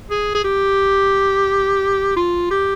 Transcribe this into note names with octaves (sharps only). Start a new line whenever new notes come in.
G#4
G#4
G4
F4
G4